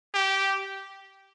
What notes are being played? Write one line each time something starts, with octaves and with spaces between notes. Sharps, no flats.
G4